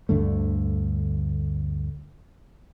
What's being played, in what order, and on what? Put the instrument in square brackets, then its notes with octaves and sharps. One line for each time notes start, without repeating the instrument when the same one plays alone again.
[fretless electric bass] D2 G2 D3 A3